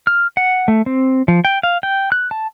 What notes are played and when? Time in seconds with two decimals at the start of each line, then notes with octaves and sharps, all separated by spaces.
0.07 F6
0.37 F#5
0.68 A3
0.86 C4
1.28 F3
1.45 G5
1.63 F5
1.83 G5
2.12 F#6
2.31 A5